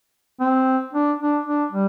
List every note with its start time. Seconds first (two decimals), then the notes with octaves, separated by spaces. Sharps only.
0.40 C4
0.93 D4
1.20 D4
1.46 D4
1.72 G3